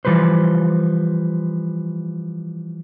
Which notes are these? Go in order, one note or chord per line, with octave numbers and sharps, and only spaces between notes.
E3 F3 G3 B4 C5